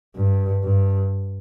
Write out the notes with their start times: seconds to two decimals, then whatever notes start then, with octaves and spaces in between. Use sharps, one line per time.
0.16 G2
0.63 G2